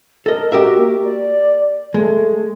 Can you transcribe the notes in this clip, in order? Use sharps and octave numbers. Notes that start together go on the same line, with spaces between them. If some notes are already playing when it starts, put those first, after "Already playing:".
A4 A#4 D#5
F#4 G4 A#4 E5
A#3
D5
G#3 A3